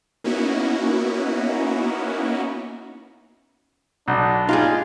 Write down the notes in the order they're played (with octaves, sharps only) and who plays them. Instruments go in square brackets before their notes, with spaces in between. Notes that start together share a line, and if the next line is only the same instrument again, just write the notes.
[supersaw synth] A#3 B3 C#4 D#4 E4 F#4
[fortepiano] B1 [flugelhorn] D4
[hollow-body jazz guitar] D#4 G4 G#4 [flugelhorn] F4